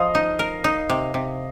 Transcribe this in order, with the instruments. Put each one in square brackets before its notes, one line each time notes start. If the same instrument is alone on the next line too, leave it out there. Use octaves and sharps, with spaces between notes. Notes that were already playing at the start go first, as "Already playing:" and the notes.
Already playing: [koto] F3 [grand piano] D#5 F5 D#6
[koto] D#4
A#4
D#4
C3
C3